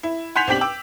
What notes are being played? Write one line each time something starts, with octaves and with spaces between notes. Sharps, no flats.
E4
F#5 G#5 C6 G6 B6 F7
B1 C4 D4 G4 B6 F#7
G5 D6 E6